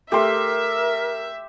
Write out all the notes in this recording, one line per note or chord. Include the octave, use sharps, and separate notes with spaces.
A3 G4 A#4 E5 C6